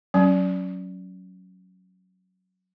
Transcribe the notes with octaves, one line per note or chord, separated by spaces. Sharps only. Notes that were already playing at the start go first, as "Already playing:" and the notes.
F#3 C#4